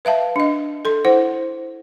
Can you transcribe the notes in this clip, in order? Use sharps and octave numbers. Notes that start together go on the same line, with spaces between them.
B4 E5 F5 A5
D4 D#5
A4 C6
E4 C5 F#5